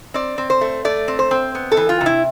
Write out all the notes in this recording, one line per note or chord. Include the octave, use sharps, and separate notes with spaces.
C4 D5
C4
C5
A3
A3 D5
C4
C5
C4
B3
A4
E3
F4
C3
E4